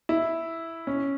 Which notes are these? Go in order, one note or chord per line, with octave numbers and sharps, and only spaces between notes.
E4
C#4